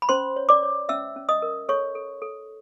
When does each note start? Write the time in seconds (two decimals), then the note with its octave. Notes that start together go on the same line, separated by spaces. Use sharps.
0.02 B5
0.09 C#4 C5 C6
0.36 C#5
0.49 D5 D6
0.63 C#5
0.89 C#4 E5 E6
1.16 C#4
1.29 D#5 D#6
1.42 A#4
1.69 A4 C#5 C#6
1.95 A4
2.22 A4